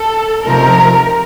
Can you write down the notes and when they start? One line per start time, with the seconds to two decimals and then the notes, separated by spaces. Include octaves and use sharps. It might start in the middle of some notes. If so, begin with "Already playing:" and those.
Already playing: A4
0.46 C3 F3 A3 C4 D#4 A#4